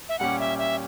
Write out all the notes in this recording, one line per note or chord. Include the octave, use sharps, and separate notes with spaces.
E5
A#2 G3 C#4 G4 F#5
E5
E5